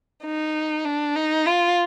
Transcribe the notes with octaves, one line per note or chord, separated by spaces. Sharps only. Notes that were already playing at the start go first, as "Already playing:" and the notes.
D#4
D4
D#4
F4